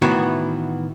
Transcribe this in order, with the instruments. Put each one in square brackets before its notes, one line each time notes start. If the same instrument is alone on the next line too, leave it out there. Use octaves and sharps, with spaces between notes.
[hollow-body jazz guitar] A2 D#3 E3 B3 E4 F#4